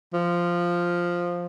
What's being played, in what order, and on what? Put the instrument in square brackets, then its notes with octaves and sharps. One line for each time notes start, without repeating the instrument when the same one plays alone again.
[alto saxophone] F3